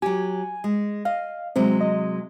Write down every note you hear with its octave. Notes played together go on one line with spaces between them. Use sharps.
F#3 G4 G#5
G#3
D#5 F5
C3 F#3 G#3 C4
D#5